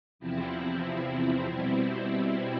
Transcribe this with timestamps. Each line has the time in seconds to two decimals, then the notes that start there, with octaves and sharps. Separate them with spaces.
0.19 E2 C3 F3 C4 E4
1.46 B2 G3 C4 E4